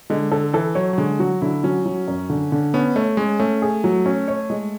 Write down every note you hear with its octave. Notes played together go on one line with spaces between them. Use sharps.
D3 G#3
D3 A4
E3 A4
F#3 C#5
F#3
D3 G#3
F#3 F#4
D3 E4
F#3 C#4
F#3
F#2
D3
D3
B3 C#4
A3 C#5
G#3 C#4
A3 C#4
G#4
F#3
C#4
C#5
G#3